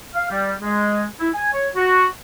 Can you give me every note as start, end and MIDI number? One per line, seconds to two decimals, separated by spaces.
0.15 0.27 77
0.31 0.52 55
0.62 1.03 56
1.21 1.29 64
1.35 1.48 80
1.53 1.68 73
1.75 2.06 66